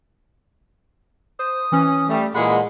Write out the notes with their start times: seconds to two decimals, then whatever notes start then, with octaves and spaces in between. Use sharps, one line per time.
1.39 C5 D#6
1.72 E3 C#4
2.08 G3 A3
2.34 A#2 E3 G#3 F#5 B5